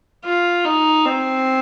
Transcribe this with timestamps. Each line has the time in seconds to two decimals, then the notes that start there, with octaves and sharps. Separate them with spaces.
0.25 F4
0.65 D#4
1.05 C4